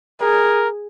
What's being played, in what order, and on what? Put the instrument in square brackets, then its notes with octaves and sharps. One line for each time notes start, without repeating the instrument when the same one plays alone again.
[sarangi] G#4 [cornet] A#4